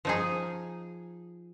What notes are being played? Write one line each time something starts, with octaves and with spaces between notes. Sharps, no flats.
F3 D#4 G#4